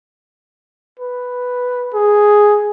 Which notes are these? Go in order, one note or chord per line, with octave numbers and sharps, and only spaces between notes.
B4
G#4